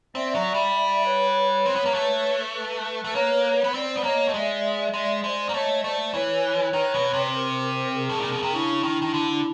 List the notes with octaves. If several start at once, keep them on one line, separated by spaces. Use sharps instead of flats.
C4 D5 E5
F#3
G3
D5 E5
B4 C#5
C4
B3
A#3
A3
A4 B4
A3
A#3 B4 C#5
B3
C4 C5 D5
B3
A#3 C#5 D#5
A3
G#3 D5 E5
G#3 D5 E5
G#3 C5 D5
A#3
A3 C#5 D#5
A3 C5 D5
E3 B4 C#5
D#3
B2
C3
A#4 C5
G#4 A#4
A2
A#2
B2
C3
C#3 D4 E4
D#3
D#3
D3